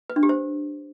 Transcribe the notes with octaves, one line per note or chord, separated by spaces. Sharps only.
B4
D4
G4
C5